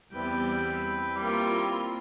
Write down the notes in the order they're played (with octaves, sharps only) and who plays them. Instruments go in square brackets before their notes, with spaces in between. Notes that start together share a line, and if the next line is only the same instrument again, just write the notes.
[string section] E2 G3 B3 [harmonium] C4 E4 [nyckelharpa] B4 G5
[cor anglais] G3 [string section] A#3 F4